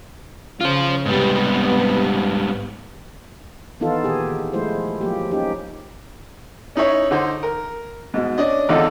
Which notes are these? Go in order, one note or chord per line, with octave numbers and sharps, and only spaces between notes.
C#3 F4 C5
G#2 C3 G3 B3
D#3 E3 B3 D#4 F4 A4
A#2 D#3 G4 G#4
D#3
F3 G#3 A3 E4 C5
F3 F#3 A#3 G4
C#4 D#4 G4
C#4 D#4 E4 C#5
D3 D#4 C5
A#4
G#2 B2
C#4 D4 D#5
G#1 E2 D3 D#4 F4 A4